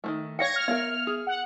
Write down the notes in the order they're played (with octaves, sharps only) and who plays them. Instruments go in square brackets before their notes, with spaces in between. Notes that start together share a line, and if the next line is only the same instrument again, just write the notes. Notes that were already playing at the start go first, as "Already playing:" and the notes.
[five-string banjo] D#3 F3 A3
[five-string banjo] C#5 F5 G5 [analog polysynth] G#6 A#6 C#7
[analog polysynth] F6
[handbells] B3 E5 [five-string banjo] A#4 C#5 F5
[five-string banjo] G#4
[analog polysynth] F#5